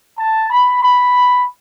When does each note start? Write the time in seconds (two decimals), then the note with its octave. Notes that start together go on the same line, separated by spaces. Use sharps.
0.17 A5
0.50 B5
0.83 B5